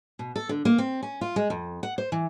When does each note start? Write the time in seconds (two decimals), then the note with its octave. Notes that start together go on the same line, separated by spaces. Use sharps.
0.19 B2
0.36 A4
0.49 D3
0.65 A#3
0.78 C4
1.03 C#4
1.21 F4
1.36 G#3
1.50 F2
1.83 F#5
1.98 C5
2.12 E3